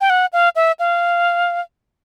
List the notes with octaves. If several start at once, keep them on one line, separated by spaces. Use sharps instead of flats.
G5
F#5
F5
E5
F5